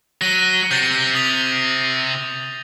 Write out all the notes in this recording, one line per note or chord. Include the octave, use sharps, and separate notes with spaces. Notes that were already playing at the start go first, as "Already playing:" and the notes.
F#3 A#6 D#7 G7
C3 G6 A6 A#6
D#6 F7